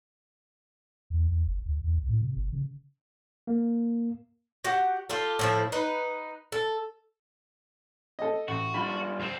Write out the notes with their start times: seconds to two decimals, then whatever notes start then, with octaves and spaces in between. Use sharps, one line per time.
1.10 E2
1.28 E2
1.46 F#1
1.66 D2
1.84 E2
1.97 C2
2.08 A2
2.22 C3
2.36 G1
2.52 C#3
3.47 A#3
4.64 F#4 G4 F#5
5.09 F4 G4 A4
5.39 A2 F3 E4
5.72 D#4 B4
6.52 A4
8.19 A4 D#5
8.48 A1 F#4
8.74 G3 D4 F4 B5
9.19 D2 C4